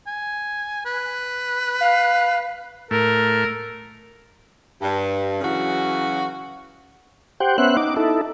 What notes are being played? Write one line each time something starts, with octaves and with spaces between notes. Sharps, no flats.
G#5
B4
F5
A2 A3 A#4
G2
C#3 E3 F#3 F#4
G4 C5 F#5 G5
B3 C#4 C5 E5 F#5 F#6
D#4 D6
D#4 E4 A4